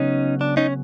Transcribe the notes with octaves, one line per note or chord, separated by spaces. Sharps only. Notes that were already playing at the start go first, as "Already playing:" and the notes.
Already playing: C#3 F#3 B3 C#4 D#4
D4
C#4 D#4